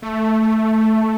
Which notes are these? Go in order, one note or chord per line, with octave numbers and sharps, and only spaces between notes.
A3